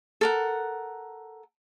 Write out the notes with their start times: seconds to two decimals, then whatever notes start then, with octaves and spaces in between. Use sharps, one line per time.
0.21 A4 A#4 F#5